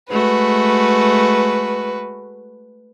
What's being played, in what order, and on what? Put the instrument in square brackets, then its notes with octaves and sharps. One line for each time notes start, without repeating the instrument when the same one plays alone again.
[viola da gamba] G#3 A3 F#4 [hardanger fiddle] B4